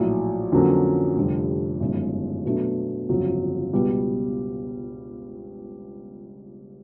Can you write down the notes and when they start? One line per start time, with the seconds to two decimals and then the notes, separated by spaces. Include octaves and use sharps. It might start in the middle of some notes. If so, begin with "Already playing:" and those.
Already playing: A#1 A2 F#3
0.52 F2 D3 F#3 A#3 C#4
1.16 F1 F2 D3 G3
1.80 G1 F#2 D#3 G#3
2.46 B2 F#3 A3 D4
3.09 G1 F2 C#3 F#3
3.73 C#2 B2 G3 B3